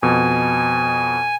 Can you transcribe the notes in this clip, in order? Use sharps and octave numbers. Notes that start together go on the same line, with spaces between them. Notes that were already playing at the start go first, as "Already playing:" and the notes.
F2 B2 G#5